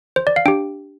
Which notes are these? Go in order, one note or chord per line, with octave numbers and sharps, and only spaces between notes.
C5
D5
F5
D4 G4 G5